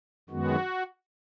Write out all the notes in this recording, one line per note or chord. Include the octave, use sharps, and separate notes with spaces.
F#2 D#3 G#3 B3 F#4